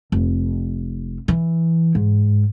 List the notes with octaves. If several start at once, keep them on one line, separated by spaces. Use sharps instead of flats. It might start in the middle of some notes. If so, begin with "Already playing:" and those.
F1
E3
G#2